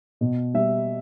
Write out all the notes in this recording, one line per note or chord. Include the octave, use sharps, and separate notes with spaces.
B2
G3 E5